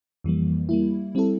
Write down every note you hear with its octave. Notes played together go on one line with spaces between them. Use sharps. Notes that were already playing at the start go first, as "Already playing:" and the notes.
F2 E3 G3 A#3
G3 A#3 E4
G3 C4 E4 A4